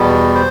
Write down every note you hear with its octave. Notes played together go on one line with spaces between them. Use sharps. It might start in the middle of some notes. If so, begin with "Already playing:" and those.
Already playing: E2 B2 G3 B3
C5